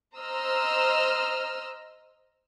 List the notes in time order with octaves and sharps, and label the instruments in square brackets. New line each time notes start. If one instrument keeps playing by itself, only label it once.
[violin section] C5 D#5 A#5 E6 F6